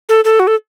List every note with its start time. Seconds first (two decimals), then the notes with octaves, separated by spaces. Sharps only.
0.09 A4
0.25 A4
0.40 F#4
0.47 A4